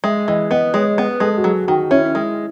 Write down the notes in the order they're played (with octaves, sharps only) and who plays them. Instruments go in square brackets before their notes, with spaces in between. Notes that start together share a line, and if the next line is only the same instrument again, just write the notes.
[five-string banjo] G#3 [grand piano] E5
[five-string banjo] E3 [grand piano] D#5
[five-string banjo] B3 [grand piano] D#5
[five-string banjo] G#3 [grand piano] C#5
[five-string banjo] B3 [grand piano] B4
[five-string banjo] G#3 [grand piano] A4
[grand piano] F#4
[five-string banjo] F#3 [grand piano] G#4
[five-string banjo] D#3 [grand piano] F#4
[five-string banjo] C#4 [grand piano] E4
[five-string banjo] G#3